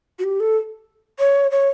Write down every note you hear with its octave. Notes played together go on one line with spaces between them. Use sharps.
F#4
G4
A4
C#5
C#5